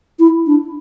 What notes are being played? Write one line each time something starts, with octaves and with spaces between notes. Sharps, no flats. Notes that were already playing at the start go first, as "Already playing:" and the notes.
E4
D4